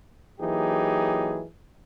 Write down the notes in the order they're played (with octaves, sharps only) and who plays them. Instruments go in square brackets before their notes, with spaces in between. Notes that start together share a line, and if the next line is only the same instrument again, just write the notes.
[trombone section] E3 F#3 A#3 D#4 G4 G#4